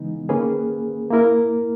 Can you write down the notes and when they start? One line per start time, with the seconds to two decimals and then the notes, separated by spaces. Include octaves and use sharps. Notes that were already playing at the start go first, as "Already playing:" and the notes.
Already playing: C#3 E3 G#3 B3 D#4
0.29 D#3 A#3 C#4 G#4 B4
1.11 A#3 E4 A#4